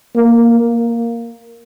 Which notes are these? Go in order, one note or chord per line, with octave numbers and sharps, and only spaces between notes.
A#3